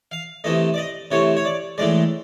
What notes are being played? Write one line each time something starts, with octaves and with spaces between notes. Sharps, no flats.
F5
C3 E3 A3 D#5
D5
D#5
C3 E3 A3 C#5
C#5
D5
A2 E3 G#3 D5